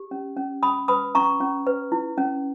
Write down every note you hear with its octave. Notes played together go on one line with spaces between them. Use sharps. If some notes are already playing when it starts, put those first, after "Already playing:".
Already playing: G4
C#4
C#4
C#4 B5 D#6
B4 B5 D#6
C#4 A#5 C#6
C#4
B4
E4
C#4